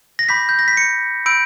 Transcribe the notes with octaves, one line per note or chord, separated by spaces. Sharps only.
A#6
B5 D6 G6 B6
G6
A#6
B6
C#7
B5 E6 G6 D7